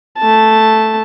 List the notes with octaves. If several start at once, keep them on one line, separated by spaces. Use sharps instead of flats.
A3 A5